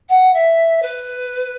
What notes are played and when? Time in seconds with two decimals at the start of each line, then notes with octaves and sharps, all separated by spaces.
0.09 F#5
0.34 E5
0.82 B4